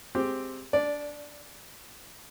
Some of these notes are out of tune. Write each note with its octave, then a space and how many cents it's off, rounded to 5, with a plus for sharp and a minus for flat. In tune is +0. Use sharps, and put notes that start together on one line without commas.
G#3 +0 C4 +0 G4 +0
D4 -20 D5 +0